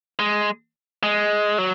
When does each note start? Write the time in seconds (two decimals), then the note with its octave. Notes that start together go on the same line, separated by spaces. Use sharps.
0.19 G#3
1.03 G#3
1.58 F#3